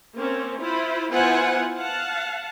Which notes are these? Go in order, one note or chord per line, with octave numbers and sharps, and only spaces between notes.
A#3 C4 C#4
E4 F4 C5 B5
B3 E4 F4 C5 F#5 G#5
F5 F#5 A5